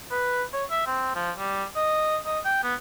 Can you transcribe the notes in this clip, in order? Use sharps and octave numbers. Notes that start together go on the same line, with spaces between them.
B4
C#5
E5
C4
F3
G3
D#5
D#5
G5
B3